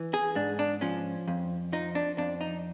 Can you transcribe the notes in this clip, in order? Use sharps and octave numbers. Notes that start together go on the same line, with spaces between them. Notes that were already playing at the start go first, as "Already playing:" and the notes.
Already playing: E3
G#4
G#2 D4
D4
F3 C#4
F2
F3 D#4
D4
F2 D4
D#4